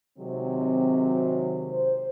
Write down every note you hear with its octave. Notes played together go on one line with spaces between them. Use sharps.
C3 D#3 F#3 G#3 C4
C5